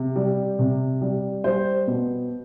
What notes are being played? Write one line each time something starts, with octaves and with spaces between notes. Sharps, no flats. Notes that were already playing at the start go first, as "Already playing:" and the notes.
Already playing: C3
G3
C3
G3
G3 C5
B2